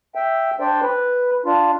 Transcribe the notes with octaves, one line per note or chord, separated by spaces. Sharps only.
E5 G5
D4 C5 D5 G5
B4
D4 F4